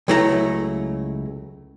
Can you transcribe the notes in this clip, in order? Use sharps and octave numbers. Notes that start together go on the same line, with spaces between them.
C#2 F#3 A3 E4 C5 A#5